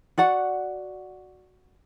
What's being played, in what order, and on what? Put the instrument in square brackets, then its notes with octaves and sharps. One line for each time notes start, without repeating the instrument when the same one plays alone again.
[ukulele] F#4 D5 F#5